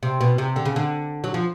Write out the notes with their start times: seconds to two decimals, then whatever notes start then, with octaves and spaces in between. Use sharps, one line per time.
0.03 C3
0.21 B2
0.38 C3
0.56 D3
0.65 C#3
0.76 D3
1.24 F#3
1.34 F3